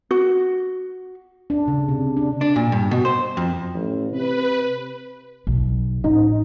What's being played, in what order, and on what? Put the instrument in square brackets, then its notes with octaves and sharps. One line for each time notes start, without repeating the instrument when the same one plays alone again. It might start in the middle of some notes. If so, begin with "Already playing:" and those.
[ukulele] F#4
[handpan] D4
C#3
C3
D4
[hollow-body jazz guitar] D4
A#2
G2
B2
C5
F2
[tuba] A1
[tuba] C3 [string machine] B4
[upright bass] B1
[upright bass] A1 [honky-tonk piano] D#4